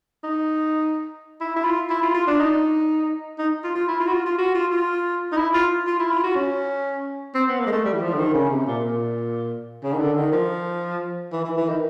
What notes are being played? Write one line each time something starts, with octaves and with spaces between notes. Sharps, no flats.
D#4
E4
E4
F4
E4
F4
F4
D4
D#4
D#4
F4
F4
E4
F4
F#4
F4
F4
F#4
F4
F4
D#4
E4
F4
F4
E4
F4
F#4
C#4
C4
B3
A#3
G#3
A3
G3
E3
F3
D3
D#3
C#3
C3
A#2
A#2
C#3
D#3
D3
D#3
F3
E3
E3
E3
D#3